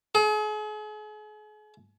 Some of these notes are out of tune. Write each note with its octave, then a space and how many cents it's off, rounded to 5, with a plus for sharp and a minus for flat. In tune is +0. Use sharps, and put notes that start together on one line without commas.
G#4 +40